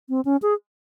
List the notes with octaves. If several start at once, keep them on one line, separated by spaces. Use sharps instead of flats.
C4
C#4
G#4